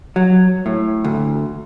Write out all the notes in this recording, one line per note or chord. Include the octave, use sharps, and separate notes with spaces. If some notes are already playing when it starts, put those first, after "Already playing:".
F#3
A2
D2